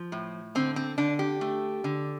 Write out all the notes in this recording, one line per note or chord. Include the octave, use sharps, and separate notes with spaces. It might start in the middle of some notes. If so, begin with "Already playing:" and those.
Already playing: F3
A2
D3 C4
C4
D3 D4
G4
A3
D3